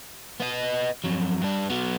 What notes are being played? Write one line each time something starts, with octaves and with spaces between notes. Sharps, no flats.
B3 D#5
F2 F#3
G2 D4
F#3 B3